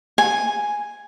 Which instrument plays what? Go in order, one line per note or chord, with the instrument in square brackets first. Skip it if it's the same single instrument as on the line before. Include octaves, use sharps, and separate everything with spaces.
[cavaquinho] G#5